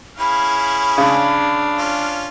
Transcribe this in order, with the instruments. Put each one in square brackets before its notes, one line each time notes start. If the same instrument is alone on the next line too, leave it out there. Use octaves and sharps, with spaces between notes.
[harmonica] C#4 E4 G#4 [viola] F5 [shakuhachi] B5
[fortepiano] C#3 [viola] D4 F5
[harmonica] C#4 F4